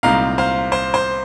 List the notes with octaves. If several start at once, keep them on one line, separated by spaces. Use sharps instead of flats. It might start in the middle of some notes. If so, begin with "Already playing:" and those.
C2 A#2 G#3 C4 D#4 F5 A#5
C5 F5
C5
C5